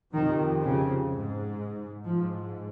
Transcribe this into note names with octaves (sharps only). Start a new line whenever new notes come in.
F2 C3 D#3
C#3
G#2
G#2 F3